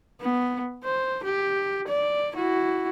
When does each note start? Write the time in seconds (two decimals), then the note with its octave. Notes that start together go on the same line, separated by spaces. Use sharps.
0.21 B3
0.85 C5
1.24 G4
1.88 D5
2.35 E4 F#4